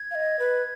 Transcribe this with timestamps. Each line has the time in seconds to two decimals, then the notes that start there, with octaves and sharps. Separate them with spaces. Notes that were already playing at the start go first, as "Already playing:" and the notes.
Already playing: G#6
0.11 F5
0.15 D#5
0.39 B4